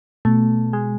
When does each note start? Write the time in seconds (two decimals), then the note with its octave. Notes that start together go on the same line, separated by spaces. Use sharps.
0.25 B2 A3
0.73 G#3